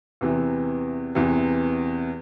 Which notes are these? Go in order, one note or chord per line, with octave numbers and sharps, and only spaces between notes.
E2 C3 E3
E2 C3 E3